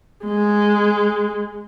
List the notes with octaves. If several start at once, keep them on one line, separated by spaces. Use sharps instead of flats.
G#3